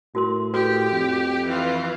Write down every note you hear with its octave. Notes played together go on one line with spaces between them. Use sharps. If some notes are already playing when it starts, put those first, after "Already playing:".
A2 F#4 A#4 C6
F#4 G4 A4 B4
F2
E3 F4